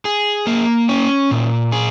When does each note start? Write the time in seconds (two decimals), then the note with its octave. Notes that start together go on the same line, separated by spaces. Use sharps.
0.05 G#4
0.47 A#3
0.89 C#4
1.31 A#2
1.72 G#4